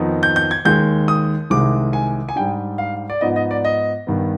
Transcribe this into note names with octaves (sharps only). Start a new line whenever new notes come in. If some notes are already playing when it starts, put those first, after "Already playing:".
Already playing: F2 D#3 B3 D#4
G6
G6
G#6
D#2 D#3 G#3 G6
D#6
C2 C3 D#3 G#3 D6
G#5
G#5
G#2 G3 D4 G5
F5
D5
G#2 F3 B3 D#4 D#5
D#5
D5
D#5
G2 D#3 B3